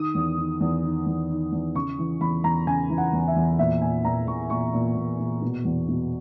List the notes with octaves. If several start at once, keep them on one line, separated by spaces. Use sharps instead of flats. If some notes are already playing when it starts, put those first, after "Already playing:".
Already playing: D#3 D#6
E2
D#3
E2
D#3
E2
D#3
E2
C#3 C#6
E3
E2 B5
E2 A#5
C#3 G#5
E3
F#5
E2
E5
E2
A#2 E5
A#2 G#5
A#2 A#5
A#2 C#6
A#2 C#6
A#2
A#2
A#2
B2
E2
B2